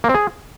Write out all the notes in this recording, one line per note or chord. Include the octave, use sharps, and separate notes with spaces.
A#3
C4
G#4